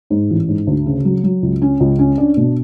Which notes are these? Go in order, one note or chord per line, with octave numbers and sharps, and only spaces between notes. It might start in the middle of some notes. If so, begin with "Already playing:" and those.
G#2
A1
G#2
D2
C#3
F#3
F#3
C#2
C#4
C#2
C#4
D4
B2